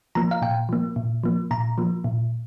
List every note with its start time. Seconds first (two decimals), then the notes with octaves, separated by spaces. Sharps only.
0.15 F3 A#3 A#5
0.31 F5
0.42 A#2 G5
0.69 F3 A#3
0.96 A#2
1.24 F3 A#3
1.51 A#2 A#5
1.78 F3 A#3
2.04 A#2